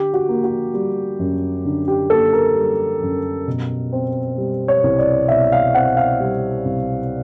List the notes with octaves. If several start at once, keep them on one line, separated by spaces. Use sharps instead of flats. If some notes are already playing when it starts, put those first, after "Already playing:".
Already playing: D3 G4
F#4
A#3
F#4
G3
F#2
D3
G4
A#3 A4
A#4
G3
F#2
B2
C4
G3
C#5
C2
D5
B2 E5
F5
C4 F#5
F5
G3
C2